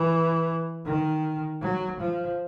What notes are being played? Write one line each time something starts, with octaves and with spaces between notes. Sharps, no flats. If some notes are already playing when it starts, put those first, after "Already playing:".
Already playing: E3
D#3
F#3
F3